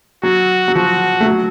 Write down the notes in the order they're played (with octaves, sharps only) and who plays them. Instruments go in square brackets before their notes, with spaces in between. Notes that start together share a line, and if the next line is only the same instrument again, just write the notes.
[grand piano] F#3 [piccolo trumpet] F#4
[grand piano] F#3
[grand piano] F3 [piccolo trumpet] F#4
[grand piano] A3
F#3